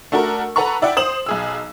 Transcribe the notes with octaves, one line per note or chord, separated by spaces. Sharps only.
A3 D4 F#4 A4 A#4
A4 B4 F#5 A#5 B5 C#6
E4 D5 E5 F#5 G5
C5 D#6 E7 F#7
B1 G#4 E6